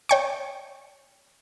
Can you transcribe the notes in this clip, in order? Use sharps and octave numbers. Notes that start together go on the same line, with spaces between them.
C#5 G5 C#6